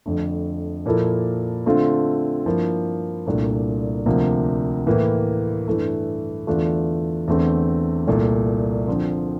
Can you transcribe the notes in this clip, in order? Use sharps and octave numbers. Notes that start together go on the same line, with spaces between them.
F2 D3 A3
A#2 F3 A#3 E4 A4
D3 A3 C4 F4
G2 F3 A#3 E4
C2 A#2 A3 D4
D2 C3 F3 A#3
A2 E3 A#3
G2 E3 A3
E2 D3 A3 D4 F4
E2 D3 A3 C4
C2 A#2 A3
D3 F3 C4